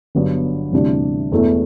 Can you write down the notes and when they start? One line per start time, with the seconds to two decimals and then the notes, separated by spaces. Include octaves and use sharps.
0.15 G1 G2 F#3 B3 D4
0.72 D2 C3 E3 G3 D4
1.32 E1 E2 B2 A3 E4